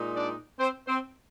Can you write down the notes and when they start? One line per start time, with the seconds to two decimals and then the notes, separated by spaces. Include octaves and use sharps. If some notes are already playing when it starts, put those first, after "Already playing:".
Already playing: A#2 G#3 D#4
0.16 D4 D5
0.59 C4 C5
0.87 C4 C5